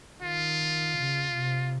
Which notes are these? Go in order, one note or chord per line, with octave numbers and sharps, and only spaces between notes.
D#3 F4
C#3
C3